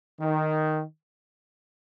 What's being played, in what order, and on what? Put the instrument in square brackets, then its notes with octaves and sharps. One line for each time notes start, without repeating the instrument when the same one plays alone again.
[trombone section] D#3